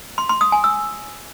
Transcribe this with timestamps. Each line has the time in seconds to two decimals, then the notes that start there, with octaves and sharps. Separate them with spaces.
0.18 C6
0.29 C6
0.41 D#6
0.52 G#5
0.64 E6